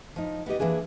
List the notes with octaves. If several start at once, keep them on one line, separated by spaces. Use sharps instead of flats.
F3 D#4
B3 D#4 G4 D#5
E3 A#3 D4 G#4 B4